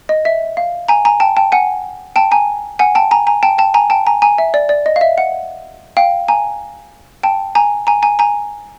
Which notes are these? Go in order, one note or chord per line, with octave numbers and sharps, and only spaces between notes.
D#5
E5
F5
G#5 A#5
G#5 A#5
G5 A5
G5 A5
F#5 G#5
G5 A5
G#5 A#5
F#5 G#5
G5 A5
G#5 A#5
G#5 A#5
G5 A5
G5 A5
G#5 A#5
G5 A5
G#5 A#5
G#5 A#5
E5
D5
D5
D#5
F5
E5
F#5
F5 G5
G#5 A#5
G5 A5
G#5 A#5
G#5 A#5
G#5 A#5
G#5 A#5